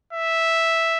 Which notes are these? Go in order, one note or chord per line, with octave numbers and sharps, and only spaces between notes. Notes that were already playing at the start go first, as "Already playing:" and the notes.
E5